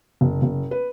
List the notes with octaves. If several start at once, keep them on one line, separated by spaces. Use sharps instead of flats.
F#1
F#1
B4